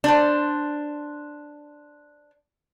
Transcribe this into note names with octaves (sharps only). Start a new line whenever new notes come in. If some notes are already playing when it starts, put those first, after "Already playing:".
D4 C5